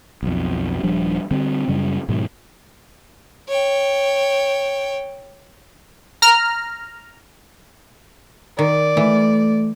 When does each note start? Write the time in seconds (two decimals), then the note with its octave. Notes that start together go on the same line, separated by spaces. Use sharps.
0.23 B1 F2
0.83 D#1 F3 G3 D4
1.31 D3 G3 C4
1.68 F#2 C#3 G3
2.08 G#2 B2 D#3 F#3
3.48 C#5 G5
6.22 A#5 F6
8.59 D#3 D5
8.97 E3 A3